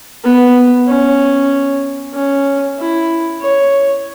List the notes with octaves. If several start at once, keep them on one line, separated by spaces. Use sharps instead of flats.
B3
C#4
C#4
E4
C#5